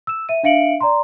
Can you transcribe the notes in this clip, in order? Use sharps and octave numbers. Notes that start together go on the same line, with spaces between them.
E6 E7
E5 D#7
D4 E5 F5 C#7 D7 F#7
D5 A#5 C6